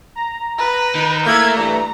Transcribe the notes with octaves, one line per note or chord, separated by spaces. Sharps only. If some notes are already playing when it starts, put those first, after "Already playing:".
A#5
B4
D#3
A3 A#3 E4 G#6
G2 E3 A#5